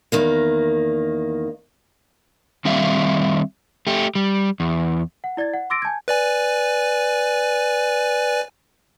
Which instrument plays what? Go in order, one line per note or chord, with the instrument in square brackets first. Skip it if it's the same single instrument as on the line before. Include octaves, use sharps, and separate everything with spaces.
[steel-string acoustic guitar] E2 D#3 A#3
[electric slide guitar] D#3 G3 C4 E5 F5
A3 G4
G3
E2
[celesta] F#5
E4 D5 G#6 A6
F#5
C6 D6 E6 A6 A#6 D7
G#5 A5 G6 G#6
[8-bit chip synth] B4 D5 G#5